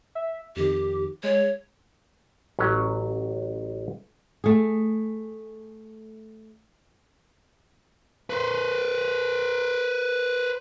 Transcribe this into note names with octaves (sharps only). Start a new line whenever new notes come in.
E5
F2 D#3 G4
G#3 C#5
A1 F#3 C#4 A#5
A3 G#4
B4 C5